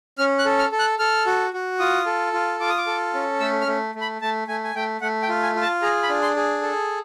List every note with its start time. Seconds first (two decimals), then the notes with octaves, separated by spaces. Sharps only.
0.18 C#4 F6
0.39 F#6
0.45 A4
0.59 F6
0.72 A4
0.79 F#6
0.99 A4 F6
1.26 F#4
1.53 F#4
1.79 F4 D#6
2.06 A4
2.33 F4
2.60 F4 D6
2.69 D#6
2.78 D6
2.87 A4
3.14 C#4
3.40 A3 E6
3.61 F6
3.67 A3
3.95 A3
4.01 B5
4.22 A3 A5
4.48 A3 G#5
4.64 G#5
4.75 A3 G5
5.01 A3 F#5
5.22 G5
5.29 F4
5.43 G#5
5.55 F4
5.62 A5
5.82 G#4 A#5
6.03 B5
6.09 D4
6.22 C6
6.36 G#4
6.62 A4